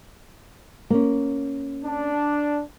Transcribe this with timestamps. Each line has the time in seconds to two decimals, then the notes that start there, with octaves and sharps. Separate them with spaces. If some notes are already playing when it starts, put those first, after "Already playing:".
0.90 A#3 C#4
1.84 D4